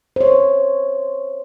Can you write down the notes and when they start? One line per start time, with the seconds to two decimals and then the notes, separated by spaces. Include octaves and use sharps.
0.16 C5 C#5